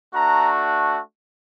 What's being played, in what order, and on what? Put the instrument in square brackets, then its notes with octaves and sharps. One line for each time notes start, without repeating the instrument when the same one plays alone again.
[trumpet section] A3 D4 F#4 A#5